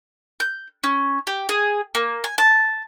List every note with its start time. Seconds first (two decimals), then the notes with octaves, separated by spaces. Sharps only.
0.40 G6
0.84 C#4
1.27 G4
1.49 G#4
1.95 A#3
2.24 G#5
2.38 A5